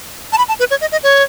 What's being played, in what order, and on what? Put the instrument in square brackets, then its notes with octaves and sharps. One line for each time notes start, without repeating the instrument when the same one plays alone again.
[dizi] A5
B5
A5
B4
C#5
D#5
D#5
C#5